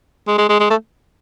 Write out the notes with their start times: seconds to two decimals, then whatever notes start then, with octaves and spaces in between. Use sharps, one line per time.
0.28 G#3
0.38 G#3
0.49 G#3
0.60 G#3
0.70 A3